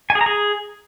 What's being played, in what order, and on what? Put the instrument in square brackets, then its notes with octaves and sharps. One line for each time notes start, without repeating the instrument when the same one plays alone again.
[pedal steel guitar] G#5
G#4
A#5
G#4